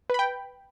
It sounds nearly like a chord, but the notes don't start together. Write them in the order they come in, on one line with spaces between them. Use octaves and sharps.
B4 B5 G5